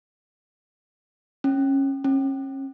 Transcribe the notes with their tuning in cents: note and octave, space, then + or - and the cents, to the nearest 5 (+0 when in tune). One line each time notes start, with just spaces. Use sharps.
C#4 -20
C#4 -35